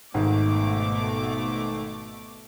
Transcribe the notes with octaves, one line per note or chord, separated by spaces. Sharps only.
G#1 G#2 B2 A3 D6